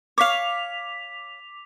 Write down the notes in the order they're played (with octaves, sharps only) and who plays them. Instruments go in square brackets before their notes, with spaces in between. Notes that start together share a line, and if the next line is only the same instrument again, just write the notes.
[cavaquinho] C#5 F5 [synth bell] D6 B6 F7